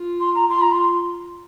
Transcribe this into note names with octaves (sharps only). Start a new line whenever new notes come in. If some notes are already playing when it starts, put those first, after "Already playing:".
Already playing: F4
C6
A#5
F4 C6
A#5
C6